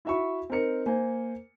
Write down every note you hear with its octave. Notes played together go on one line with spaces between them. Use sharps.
E4 F#4 E5 B5 C#6
C4 D#4 A#4 C#7
A#3 C5 G#5